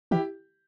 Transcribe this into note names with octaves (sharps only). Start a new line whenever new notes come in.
E3 E4 G4